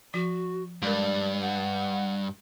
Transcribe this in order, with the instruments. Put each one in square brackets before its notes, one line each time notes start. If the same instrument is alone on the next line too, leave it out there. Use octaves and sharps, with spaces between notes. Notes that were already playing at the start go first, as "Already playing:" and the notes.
[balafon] F3 [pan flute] F#4
[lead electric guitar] G2 [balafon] G#3 A#4 [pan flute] D5
[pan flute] F#5